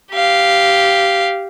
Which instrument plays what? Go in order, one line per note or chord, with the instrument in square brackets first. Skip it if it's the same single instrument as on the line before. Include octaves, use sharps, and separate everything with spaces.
[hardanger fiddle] G4 F5